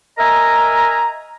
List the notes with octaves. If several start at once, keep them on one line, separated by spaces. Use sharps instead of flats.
A#4 D#5 E5 G#5 A#5